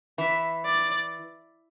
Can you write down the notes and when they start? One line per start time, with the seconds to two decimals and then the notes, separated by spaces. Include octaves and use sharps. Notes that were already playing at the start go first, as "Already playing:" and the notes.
0.18 E3 E5
0.65 D5